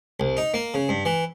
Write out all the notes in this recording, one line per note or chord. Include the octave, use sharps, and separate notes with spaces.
C2
D#4
A#3
C#3
G2
E3